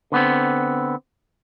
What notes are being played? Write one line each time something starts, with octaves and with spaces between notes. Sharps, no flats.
D3 B3 C4